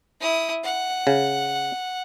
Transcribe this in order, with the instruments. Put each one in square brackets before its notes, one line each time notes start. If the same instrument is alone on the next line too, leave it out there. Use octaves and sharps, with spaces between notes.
[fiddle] E4 D#6
F#5
[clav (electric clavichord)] C#3